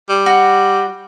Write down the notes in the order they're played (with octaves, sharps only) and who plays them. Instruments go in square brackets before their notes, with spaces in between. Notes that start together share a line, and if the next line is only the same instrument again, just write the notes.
[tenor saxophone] G3
[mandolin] F#4